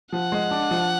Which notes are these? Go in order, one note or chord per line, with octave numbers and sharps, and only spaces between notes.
F3 F#5
G#3
D4
F3